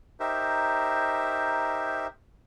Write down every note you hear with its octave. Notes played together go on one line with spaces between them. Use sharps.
D#4 G4 A#4 C5 E5